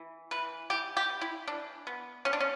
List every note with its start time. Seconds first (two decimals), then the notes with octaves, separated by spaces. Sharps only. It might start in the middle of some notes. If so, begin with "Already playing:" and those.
Already playing: E3
0.31 E3 B4
0.70 E3 G4
0.97 G4
1.09 E3
1.21 E4
1.47 E3 D4
1.87 B3
2.25 B3 C#4
2.33 D4
2.40 C#4